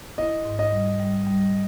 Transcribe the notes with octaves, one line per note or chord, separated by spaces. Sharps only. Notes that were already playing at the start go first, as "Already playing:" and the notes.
E4 D#5
G#2
D#5
G3
G3
G3